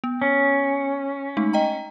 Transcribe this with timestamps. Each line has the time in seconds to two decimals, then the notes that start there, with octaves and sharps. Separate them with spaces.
0.04 B3
0.22 C#4
1.37 G#3 A3 D#4
1.53 D#5 G5 A#5